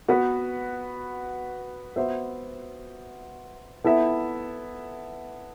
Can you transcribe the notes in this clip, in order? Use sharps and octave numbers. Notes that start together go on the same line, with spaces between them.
B3 F#4 B4
B3 F#4 C5 E5
B3 E4 A4 E5